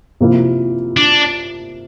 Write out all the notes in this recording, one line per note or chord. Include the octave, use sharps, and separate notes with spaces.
C3 F3 A#3 E4
D4